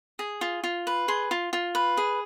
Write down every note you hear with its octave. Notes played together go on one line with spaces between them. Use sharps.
G#4
F4
F4
B4
G#4 C6
F4
F4
B4
G#4